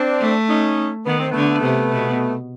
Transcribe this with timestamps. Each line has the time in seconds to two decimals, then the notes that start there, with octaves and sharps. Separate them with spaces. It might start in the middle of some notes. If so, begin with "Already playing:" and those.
Already playing: C4 D4
0.21 A3
0.49 C#4 D#4
1.06 D#3 B3
1.19 C4
1.32 D3 A3 B3
1.63 C3
1.92 B2